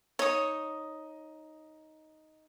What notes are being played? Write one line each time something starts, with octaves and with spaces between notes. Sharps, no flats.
D#4 C#5 D#6